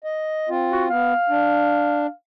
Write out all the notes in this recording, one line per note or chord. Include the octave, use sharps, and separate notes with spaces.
D#5
C4 F4
F#4
B3 F5
D4